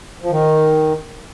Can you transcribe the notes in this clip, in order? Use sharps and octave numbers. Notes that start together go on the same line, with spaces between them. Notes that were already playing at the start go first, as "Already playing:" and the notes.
F3
D#3